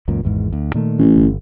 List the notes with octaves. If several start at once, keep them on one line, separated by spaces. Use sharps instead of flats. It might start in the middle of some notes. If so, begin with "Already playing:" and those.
C#2 F#2 A#2
G#1 E2 G#2
D2
A#2 D#3 A3
A1
G1